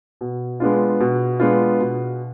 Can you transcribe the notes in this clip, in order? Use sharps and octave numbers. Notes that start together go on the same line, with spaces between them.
B2
G#3 B3 D4 F4
B2
G#3 B3 D4 F4
B2